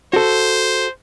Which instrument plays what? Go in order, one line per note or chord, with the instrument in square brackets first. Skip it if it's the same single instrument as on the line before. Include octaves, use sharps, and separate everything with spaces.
[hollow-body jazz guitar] F#4 A4 [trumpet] C5